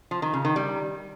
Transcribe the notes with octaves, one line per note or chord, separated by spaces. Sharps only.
F3
D#3
C#3
D#3
G3